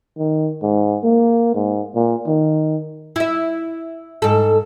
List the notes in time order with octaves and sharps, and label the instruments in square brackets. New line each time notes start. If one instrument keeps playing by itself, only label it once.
[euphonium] D#3
G#2
A#3
G#2
A#2
D#3
[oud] E4 E5
G#2 A4